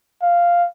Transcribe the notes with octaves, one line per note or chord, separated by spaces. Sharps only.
F5